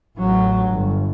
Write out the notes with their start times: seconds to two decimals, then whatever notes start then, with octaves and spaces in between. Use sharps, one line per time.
0.17 A1 F#3
0.68 G1